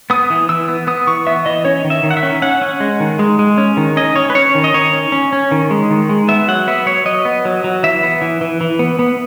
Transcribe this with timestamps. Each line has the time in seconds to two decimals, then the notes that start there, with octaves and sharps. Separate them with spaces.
0.10 B3 D#6
0.30 E3
0.49 E3 E6
0.69 B3
0.87 B3 D#6
1.07 E3 C#6
1.27 B3 E5
1.46 E3 D#5
1.65 C#4 C#5
1.84 D#3
1.90 E5
2.03 D#3
2.11 F#5
2.17 E5
2.23 C#4
2.42 C#4 F#5
2.61 C#4
2.80 G#3
3.00 D#3
3.19 G#3
3.39 G#3
3.58 C#4
3.77 D#3
3.97 C#4 D#5
4.16 C#4 C#5
4.30 B4
4.35 C#4 C#5
4.55 D#3
4.64 D#5
4.74 D#3 C#5
4.93 C#4
5.12 C#4
5.33 C#4
5.52 D#3
5.71 G#3
5.91 D#3
6.09 G#3
6.28 B3 E5
6.48 F#3 F#5
6.67 B3 E5
6.86 F#3 C#5
7.05 F#3 D#5
7.25 B3
7.45 F#3
7.64 F#3
7.83 E3 E5
8.03 B3
8.22 E3
8.41 E3
8.61 E3
8.79 B3
8.99 B3